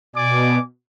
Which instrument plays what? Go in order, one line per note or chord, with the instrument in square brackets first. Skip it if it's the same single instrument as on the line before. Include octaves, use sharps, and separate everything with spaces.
[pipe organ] B2 [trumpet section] D5 G#5 D6